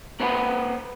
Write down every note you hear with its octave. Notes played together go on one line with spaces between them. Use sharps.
A#3 B4 C5 F#5 B5